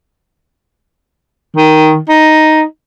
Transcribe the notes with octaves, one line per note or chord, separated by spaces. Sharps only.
D#3
D#4